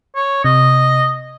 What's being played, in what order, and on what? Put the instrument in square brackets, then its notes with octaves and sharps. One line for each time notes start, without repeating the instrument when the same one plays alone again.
[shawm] C#5
[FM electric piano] C3 [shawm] D#5